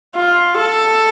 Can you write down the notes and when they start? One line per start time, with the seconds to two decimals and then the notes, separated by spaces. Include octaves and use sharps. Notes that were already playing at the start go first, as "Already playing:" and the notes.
0.16 F4
0.59 A4